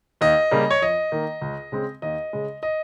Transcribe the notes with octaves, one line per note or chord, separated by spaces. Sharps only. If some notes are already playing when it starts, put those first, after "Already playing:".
D#2 D#5
C#3 G3 A#3
C#5
F2 D#5
D#3 A#3
C#2
C#3 G#3 C4
D#2 D#5
C#3 G#3
D#5